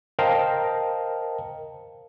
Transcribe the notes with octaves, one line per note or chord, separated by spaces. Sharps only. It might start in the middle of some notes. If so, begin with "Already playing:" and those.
A#4 C5 D#5 F5 G5 A5